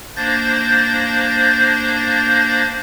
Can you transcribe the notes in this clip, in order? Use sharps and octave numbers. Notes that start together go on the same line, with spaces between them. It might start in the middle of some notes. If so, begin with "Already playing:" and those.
A#3 D4 C5 G6 A6 A#6